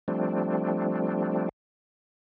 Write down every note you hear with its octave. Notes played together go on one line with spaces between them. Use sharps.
F3 G3 A3 C4 D4